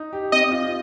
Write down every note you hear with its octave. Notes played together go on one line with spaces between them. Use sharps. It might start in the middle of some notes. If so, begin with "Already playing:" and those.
Already playing: D#4
G4
C4 D#5
F4